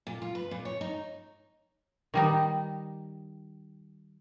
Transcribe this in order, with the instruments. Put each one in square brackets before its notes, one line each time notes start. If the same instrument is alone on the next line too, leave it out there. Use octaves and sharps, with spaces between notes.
[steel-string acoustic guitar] A#2
F4
B4
A#2
C#5
D#4
[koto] D#3 G3 D#4